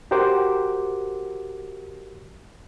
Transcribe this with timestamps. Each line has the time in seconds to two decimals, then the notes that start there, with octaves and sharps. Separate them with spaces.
0.11 F#4 G4 A#4 C5 F#5 D6